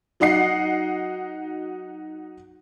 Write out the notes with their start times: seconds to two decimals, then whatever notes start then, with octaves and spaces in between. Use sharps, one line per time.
0.20 F#3 D#4 D#5 F#5 C7